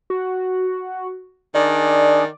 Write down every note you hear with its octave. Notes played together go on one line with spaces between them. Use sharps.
F#4
D#3 D4 G#4 D5